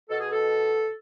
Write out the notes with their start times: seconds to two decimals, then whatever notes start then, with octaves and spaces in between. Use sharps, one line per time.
0.10 B2 A4
0.20 G#4
0.31 A4